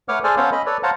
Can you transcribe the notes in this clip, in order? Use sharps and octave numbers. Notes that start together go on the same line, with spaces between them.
A3 B4 C#5 F#5 D6 F6
G#4 A4 C5 D5 G#5 F6
B3 C#4 A4 C5 C#5 F5
C#4 D#5 B5
A4 B4 C#5 D5
C5 C#5 F5 F#5 A5 A#5